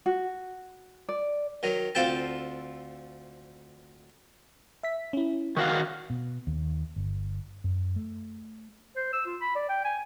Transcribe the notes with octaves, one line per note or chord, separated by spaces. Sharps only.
F#4
D5
D#3 F#3
D2 C4 F4 A4 G5 A5
E5 B6
C#4 E4
D#3 F#4 F5 C#6 F#6
B2
D#2
G1
F#2
A3
C5
E6
F4
B5
D5
G5
G#5